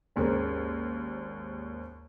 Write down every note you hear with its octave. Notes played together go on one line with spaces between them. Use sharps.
G#1 D#2 C#4 G#4 A#4 C5